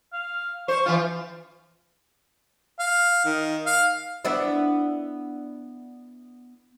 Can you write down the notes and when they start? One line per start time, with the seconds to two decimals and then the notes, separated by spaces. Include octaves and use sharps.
0.13 F5
0.68 C5 C#6
0.86 E3 F4 F5
2.80 F5
3.25 D#3
3.66 F5
4.25 B3 D4 E4